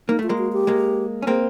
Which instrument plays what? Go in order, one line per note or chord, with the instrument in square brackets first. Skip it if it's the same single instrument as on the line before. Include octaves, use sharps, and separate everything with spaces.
[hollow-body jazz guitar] A#3 [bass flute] D#4
[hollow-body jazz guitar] A3 [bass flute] F4
[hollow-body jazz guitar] G#3 A#3
[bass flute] F#4
G4
[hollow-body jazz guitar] G#3 A#3
C#4
[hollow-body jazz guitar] A#3 C4 [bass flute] G#4